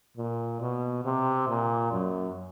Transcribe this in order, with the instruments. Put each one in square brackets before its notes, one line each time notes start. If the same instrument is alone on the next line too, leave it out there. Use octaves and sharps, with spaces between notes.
[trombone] A#2
B2
C3
A#2
F#2